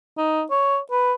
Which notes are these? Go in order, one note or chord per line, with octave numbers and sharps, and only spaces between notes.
D#4
C#5
B4